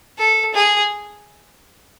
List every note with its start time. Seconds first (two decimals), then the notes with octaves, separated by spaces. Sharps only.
0.18 A4
0.54 G#4